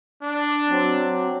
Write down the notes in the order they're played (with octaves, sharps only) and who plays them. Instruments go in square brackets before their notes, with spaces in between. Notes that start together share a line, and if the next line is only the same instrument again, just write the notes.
[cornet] D4
[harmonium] F#3 C4